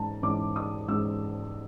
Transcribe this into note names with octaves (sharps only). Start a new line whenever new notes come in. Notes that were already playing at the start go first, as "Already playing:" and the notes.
Already playing: G#2 E3 G#3 C#4 A5 A#5
G#2 E3 G#3 C#4 D6
D#6
G#2 E3 G#3 C#4 E6